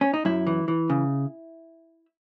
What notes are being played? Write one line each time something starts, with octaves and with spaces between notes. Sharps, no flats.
C#4
D#4
F#2 E4
E3
E3
C#3